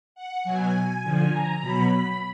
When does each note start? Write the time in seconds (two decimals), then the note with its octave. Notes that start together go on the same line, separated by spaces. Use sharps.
0.15 F#5
0.44 B2 F#3 G#5
1.03 D3 F3
1.32 A#5
1.61 B2 F#3 B5
1.90 B5